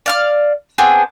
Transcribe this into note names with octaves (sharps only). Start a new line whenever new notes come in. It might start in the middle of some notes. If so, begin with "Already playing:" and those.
D5 F5 F6
B3 C4 D4 G#4